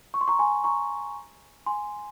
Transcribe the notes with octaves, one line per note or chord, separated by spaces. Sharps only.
C#6
C6
A#5 C#6
G#5 C6
A#5 C#6
G#5 C6